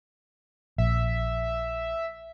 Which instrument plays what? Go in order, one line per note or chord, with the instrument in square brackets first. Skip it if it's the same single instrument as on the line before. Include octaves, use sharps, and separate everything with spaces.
[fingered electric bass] A#1 [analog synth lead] E5